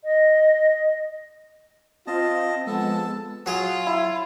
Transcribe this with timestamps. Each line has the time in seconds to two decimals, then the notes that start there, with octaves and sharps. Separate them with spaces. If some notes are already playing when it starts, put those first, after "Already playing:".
0.04 D#5
2.07 C4 F4 D#5 A5
2.67 F3 G#3 B3 A4 A5
3.46 F#3 F4 G#4
3.87 E4